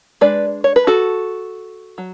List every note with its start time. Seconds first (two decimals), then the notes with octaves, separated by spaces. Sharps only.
0.21 G#3 D4 B4 D5
0.64 C#5
0.76 B4
0.87 F#4 A4
1.98 F#3